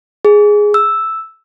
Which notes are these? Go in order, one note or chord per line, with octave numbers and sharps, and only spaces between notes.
G#4
E6